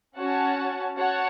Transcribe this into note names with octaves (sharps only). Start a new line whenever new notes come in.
C#4 F#4 C#5 F#5 A5
F#4 C#5 F#5 A5